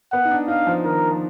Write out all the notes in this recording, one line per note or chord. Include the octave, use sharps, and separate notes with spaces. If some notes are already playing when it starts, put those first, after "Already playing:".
B3 F#5
D#4
D4
D#4 F5
F3
D#3 A#4
F3